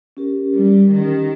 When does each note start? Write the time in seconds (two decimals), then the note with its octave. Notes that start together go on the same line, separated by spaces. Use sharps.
0.17 C#4 G4 A#4
0.53 G3
0.90 D#3